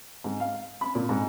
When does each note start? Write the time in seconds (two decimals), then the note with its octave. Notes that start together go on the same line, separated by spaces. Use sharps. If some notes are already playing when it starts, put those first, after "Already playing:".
0.24 G#2
0.40 F5
0.81 B5
0.95 A#2
1.09 G#2